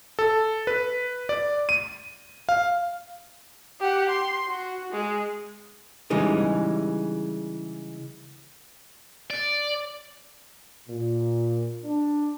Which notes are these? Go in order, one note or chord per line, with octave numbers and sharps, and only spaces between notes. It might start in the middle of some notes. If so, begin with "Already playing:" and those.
A4
B4
D5
D#7
F5
G4 F#5
C6
F#4
G#3
C#3 E3 G3 G#3 D#4
D5
A#2
D4